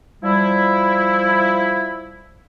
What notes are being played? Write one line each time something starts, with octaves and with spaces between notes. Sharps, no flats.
F3 G3 E4